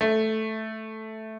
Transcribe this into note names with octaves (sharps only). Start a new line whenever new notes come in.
A3